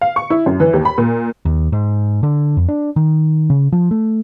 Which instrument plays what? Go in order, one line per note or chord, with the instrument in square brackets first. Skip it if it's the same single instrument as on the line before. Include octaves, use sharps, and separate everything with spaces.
[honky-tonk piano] F5
C#6
E4
F#2
E3
D#2
B5
A#2
[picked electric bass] D#2
G#2
D3
F2
D4
D#3
C#3
F3
A3